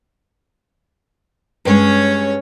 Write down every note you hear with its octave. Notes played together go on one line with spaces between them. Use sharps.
G2 G#3 C#4 C#5